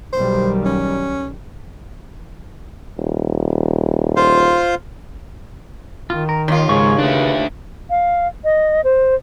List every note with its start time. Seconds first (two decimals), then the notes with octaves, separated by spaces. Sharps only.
0.13 B1 D#3 G3 C5
0.65 C#4
2.98 D#1
4.16 F4 C5 F5
6.10 D#3 F4
6.29 A#4
6.48 D#2 D#4 F4
6.69 G#2 C#3 C#5 F5 C#6
6.98 A3 D4 B4
7.90 F5
8.44 D#5
8.84 C5